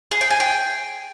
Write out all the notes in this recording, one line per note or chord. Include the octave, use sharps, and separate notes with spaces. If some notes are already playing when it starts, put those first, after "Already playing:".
G#4
G5
G#5
G5